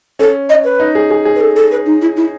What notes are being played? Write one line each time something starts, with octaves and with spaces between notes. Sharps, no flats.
C#4 A4
D#5
B4
D#4
G#4
G#4
G#4
B4
A4
A4
B4
D#4
E4
E4